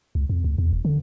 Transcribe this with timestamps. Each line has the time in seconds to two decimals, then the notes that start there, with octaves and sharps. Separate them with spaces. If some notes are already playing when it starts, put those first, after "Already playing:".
0.15 C#2
0.30 F2
0.44 D2
0.58 E2
0.73 E1
0.85 D3